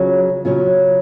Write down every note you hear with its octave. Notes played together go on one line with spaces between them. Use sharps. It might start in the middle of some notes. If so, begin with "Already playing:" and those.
Already playing: C#3 F#3 C#4 F4
C#3 F#3 C#4 F4